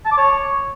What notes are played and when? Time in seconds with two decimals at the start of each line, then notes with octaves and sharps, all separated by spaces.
0.05 A5
0.11 D6
0.17 C#5